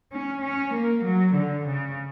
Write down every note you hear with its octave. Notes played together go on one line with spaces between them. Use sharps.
C#4
C#4
A#3
F#3
D3
C#3